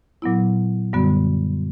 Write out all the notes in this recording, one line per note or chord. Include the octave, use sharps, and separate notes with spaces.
A#2 F#3 B3 E4
F#2 D3 G3 B3 F#4